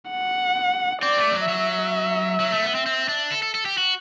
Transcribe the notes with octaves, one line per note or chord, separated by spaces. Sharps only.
F#5
C4 D5
A3
F#3
F#3 E5
F#3
A3
B3
C4
C4
D4
A4
A4
A4
G4
F#4